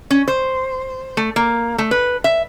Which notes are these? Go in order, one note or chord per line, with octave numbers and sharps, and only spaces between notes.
C#4
C5
A3
A#3
A3
B4
E5